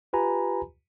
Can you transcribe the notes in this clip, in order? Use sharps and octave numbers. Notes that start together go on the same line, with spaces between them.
F4 G4 B4 G#5 A#5 B5